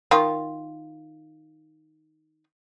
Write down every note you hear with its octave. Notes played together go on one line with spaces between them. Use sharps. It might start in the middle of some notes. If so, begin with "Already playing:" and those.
D#3 F4